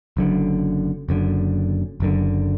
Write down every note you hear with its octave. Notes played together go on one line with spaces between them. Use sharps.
F#1 F#2 D3
F#1 F#2 D3
F#1 F#2 D3